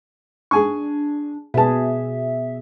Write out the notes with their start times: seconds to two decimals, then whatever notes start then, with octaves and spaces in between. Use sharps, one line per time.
0.51 D4 G#4 G#5 C#6
1.54 B2 G#4 B4 E5 A5